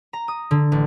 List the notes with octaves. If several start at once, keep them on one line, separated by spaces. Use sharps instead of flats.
A#5
D#6
D3
A1